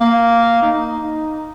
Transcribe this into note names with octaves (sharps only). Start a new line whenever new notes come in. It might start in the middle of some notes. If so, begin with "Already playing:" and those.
A#3
D#4